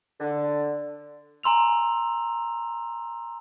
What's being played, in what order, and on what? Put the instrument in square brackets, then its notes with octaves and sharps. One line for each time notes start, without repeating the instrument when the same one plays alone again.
[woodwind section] D3
[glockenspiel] G#5 A#5 C6 E6 F7